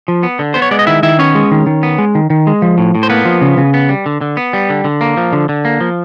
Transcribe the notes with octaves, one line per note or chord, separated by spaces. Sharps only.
F3
B3
D3
B3 C5
C#5
G#3 D5
D#5
D#3 E4 E5
D#3 E4 E5
B3 C#4 C#5
G#3
D#3
D#3
B3
G#3
D#3
D#3
G#3
F3
A2
A2
C5
A#3 B3 B4
F3
C#3
C#3
B3
G3
D3
D3
B3
G3
D3
D3
A#3
F3
D3
D3
A#3
F3